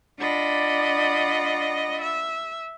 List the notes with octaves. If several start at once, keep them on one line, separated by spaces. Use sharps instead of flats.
D4 F4 D5 D#5 F#5 B5
E5